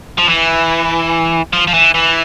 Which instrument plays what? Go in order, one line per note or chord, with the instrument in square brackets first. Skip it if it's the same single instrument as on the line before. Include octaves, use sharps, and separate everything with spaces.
[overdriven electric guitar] F3
E3
F3
F3
E3
E3